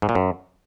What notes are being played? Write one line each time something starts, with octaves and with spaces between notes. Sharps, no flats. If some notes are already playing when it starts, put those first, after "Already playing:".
G#2
A#2
F#2